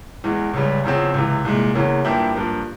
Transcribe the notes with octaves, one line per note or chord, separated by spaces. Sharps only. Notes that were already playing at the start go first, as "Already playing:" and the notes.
E2 E3 G#3
C#2 C#3 G3
E2 C#3 F3 C4
C#2 C3 E3
C2 A#2 G#3
E2 C#3 E3 A#3
G2 F3 A#3 E4 G4
G2 F3 A#3